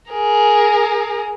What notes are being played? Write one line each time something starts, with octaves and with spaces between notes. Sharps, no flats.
G#4 A#4